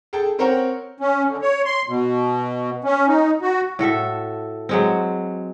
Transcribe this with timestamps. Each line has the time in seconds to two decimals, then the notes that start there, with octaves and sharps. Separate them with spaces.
0.13 G#4 A4 G5 A5
0.38 C4 A#4 C5 C#5 F#5 G5
1.00 C#4
1.28 D3
1.42 C#5
1.65 C6
1.88 B2
2.84 C#4
3.08 D#4
3.42 F#4
3.79 A2 F#4 A4 E5
4.69 F#3 G#3 C4